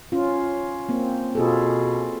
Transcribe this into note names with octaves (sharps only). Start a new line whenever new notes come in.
C#4 F4
A#3 C4
B2 F4 G#4 A4